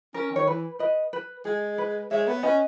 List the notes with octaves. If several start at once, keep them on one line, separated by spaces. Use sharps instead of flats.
C#4 A#4
D#3 C#5
E3 B4
B4 D#5
B4
G#3 G#4
B4
G#3 C#5 E5
B3
C#4 B4 D#5